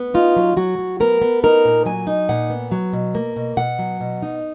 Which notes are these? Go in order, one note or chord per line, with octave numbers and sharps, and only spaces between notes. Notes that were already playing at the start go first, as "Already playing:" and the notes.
Already playing: B3
D#4 F4
F#3
F#3 F#4
F#3
B3 A#4
B3
D#4 A#4
A#2
F#3 G#5
D#4
A#2 F#5
B3
F#3
B2
A#3
B2
B2 F#5
F#3
B2
D#4